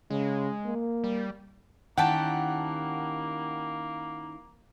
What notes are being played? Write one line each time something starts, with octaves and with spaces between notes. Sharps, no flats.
C#3 G#3
A#3
G3
D#3 A#3 C#4 E4 G4 F#5 G5 A5